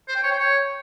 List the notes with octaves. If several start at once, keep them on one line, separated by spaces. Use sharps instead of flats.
C5
G5
C#5
G5
C#5